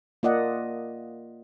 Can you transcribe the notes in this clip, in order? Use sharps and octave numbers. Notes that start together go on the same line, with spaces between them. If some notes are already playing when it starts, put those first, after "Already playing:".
A#3 F4 D5 D#5 F#5